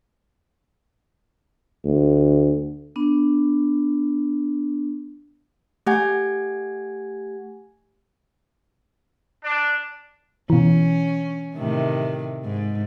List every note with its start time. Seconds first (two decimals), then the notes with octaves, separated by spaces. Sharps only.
1.85 D2
2.96 B3 D4
5.87 A3 G4 F#5 G#5 G#6
9.44 D4
10.50 B2 E3 C#4
11.55 A2 C3 D#3
12.44 G#2